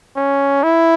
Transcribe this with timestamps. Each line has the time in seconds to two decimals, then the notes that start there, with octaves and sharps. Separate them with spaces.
0.17 C#4
0.63 E4